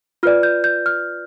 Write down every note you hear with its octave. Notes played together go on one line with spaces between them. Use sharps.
F4 B4 D5 F6
G6
G6
F6